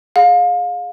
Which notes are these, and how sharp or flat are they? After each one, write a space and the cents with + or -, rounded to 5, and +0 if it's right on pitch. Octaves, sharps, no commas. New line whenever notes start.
G#4 +5 F5 +30